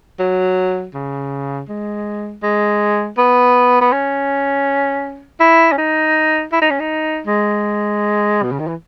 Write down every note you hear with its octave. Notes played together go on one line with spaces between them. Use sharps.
F#3
C#3
G#3
G#3
B3
B3
C#4
E4
C#4
D#4
E4
D#4
C#4
D#4
G#3
B2
C#3
D#3
E3